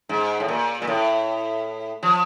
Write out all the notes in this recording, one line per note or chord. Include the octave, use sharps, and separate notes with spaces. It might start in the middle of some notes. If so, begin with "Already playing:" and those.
G#2
A2
A#2
A#2
A2
F3